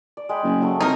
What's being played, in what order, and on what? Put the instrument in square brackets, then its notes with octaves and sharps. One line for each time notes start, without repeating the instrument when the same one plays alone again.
[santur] D5
G#3 G5 B5
[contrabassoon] F#1
[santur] F#3 A3
[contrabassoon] C2 [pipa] D#4 A#4